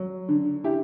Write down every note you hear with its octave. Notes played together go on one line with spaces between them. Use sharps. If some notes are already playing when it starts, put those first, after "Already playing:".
Already playing: F#3
D3
E4 G4